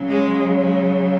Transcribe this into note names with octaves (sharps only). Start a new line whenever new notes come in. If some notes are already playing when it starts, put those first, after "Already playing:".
Already playing: C#3 F#3
G#3
G#3